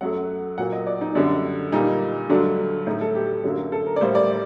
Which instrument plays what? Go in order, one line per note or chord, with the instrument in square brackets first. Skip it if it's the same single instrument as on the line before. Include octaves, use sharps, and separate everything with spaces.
[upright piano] F#2 F#3 A3 F#5
A#2 F#3 A#3 F#5
D#5
D5
D#4
F#2 D3 G3 D4
A#2 G3 A#3 D#4
G2 D3 F#3 A3 D4
A2 A3 D#4
A4
G4
F#2 D3 F#3 A#3
A4
A#4
D5
A2 G3 A#3 C5
D5